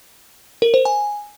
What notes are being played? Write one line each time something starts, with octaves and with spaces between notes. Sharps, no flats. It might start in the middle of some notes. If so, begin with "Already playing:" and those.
A#4
C5
G#5